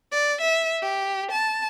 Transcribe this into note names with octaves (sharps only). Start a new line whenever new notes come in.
D5
E5
G4
A5